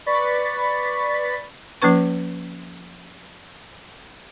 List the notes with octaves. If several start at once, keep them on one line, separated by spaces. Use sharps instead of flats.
B4 D5 B5 C#6 A6 B6
F3 A#3 C#4 B4 C#6